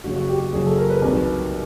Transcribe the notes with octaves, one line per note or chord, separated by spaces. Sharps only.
F#1 F#2 C#3 F#3 F#4
F#4
G4
G4
F#1 F#2 C#3 F#3 G#4
A4
A#4
B4
C2 C3 D#3 F#3